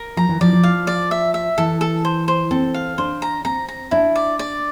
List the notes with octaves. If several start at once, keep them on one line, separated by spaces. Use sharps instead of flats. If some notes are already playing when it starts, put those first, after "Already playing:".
Already playing: A#4
F3 A#5
E3
F3 D5
F3
F5
D5
E5
E5
E3 A4
A4
C5
C5
C4 A4
F5
D4 C5
A#5
C4 A#5
A#5
D4 E4
D5
D5